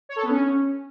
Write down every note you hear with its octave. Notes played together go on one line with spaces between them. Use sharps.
C#5
A4
B3
C#4